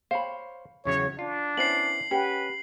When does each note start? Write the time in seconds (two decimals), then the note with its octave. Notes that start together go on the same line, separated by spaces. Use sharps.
0.11 C5 C#5 F5 B5
0.85 E2 C#3 F#3 C#5
1.19 D4 F4
1.57 B3 C#4 E4 C5 C7 F#7
2.11 C#4 G4 B4 F#5